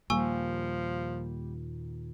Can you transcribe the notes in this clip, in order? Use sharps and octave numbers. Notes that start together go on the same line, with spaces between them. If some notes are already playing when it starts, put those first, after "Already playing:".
D#2 A#2 F3 G3 A#3 G#5 C#6 E6